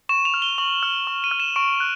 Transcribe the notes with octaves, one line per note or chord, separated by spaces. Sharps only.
C#6 E7
F7
F6
G7
C#6 F#7
F6
C#6
D#7
F6
E7
C#6 D7
F#6